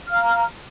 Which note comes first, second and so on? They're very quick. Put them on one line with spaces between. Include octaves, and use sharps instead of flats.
F6 F5 A#5